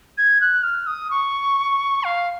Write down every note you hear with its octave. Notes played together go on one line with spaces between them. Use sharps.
G#6
F#6
F6
D#6
C#6
F5